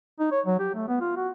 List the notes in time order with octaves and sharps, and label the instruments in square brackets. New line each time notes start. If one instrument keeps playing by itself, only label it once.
[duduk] D#4
C#5
F#3
G4
A3
B3
F4
F#4